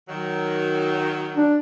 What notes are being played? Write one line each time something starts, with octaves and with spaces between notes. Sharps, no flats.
D#3 F#3
D4